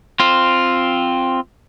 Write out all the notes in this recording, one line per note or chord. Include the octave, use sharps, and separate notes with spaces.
C4 F4